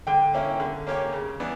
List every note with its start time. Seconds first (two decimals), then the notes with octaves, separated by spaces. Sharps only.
0.07 D3 G5
0.34 A#3 C#4 E4
0.60 D3
0.87 A#3 C#4 G4 C#5
1.13 C#3
1.40 E3 B3 D4